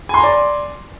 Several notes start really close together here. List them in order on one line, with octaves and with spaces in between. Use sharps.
G#5 C6 A#5 D5